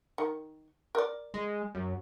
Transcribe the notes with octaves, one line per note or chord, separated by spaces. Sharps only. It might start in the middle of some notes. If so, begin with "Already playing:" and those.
D#3
A#4 D5
G#3
F#2